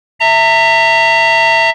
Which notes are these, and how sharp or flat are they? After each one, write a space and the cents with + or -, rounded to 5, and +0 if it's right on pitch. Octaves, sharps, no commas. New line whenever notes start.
E5 +0 A#5 -35